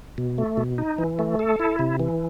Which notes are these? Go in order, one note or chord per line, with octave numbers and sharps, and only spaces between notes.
B2
A3
B2
D#4
E3
A3
A4
E4
C3
E3